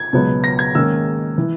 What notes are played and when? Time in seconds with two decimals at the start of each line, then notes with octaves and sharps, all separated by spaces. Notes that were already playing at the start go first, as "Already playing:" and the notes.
Already playing: G#6
0.13 C#2 B2 F#3 B3
0.44 A#6
0.59 G#6
0.74 G#2 D#3 A#3 C#4 E6
1.38 E3